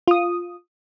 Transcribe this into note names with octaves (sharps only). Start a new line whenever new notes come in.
F4 D#6